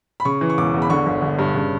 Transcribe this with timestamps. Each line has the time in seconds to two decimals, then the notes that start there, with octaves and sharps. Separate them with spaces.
0.20 B5
0.25 C#3 C#6
0.41 E3
0.50 C#6
0.58 E1 D6
0.74 E2
0.82 B5
0.90 D3 C#6
1.06 G1
1.22 G1
1.39 G2
1.55 C#3